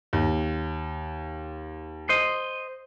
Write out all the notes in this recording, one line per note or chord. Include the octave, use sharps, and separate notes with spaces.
D#2
C5 D#5